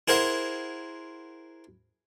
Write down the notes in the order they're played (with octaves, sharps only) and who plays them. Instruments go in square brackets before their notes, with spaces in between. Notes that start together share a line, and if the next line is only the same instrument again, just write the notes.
[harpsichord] E4 G#4 A#4 C5 F#5